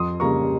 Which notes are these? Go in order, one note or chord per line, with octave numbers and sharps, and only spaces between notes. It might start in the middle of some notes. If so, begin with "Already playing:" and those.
Already playing: F2 C6 D#6
C#3 G3 A#3 A#5 C#6